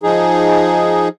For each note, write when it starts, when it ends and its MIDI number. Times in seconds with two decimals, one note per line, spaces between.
0.03 1.08 53
0.03 1.08 63
0.03 1.08 68